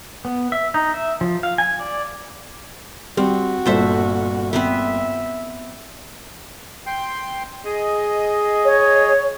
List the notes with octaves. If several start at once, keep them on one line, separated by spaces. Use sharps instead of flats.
B3
E5
D#4
E5
F3
F5
G#5
D5
G3 C4 F#4
G1 A#2 A4 C5 E5
B3 C4 B4 E5
G5 C6
G#4 D#5
C#5